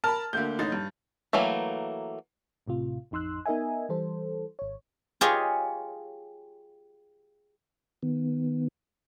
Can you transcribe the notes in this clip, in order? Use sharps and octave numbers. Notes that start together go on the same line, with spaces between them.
A#4 A5 B5 F6
D2 D3 A#3 G6
A1 D#4 A6
G2
E3 F#3 A3 A#3
A1 A2 C3 F4
A1 F2 D#4 C6 E6 F#6
B3 D#4 A#4 D#5 E5 G#5
E3 G3 A4 C5
G#1 C#5
F4 G4 G#4 C#5 D#5
D#3 B3